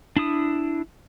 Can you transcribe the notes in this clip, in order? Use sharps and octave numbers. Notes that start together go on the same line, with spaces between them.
D4 E4 D#6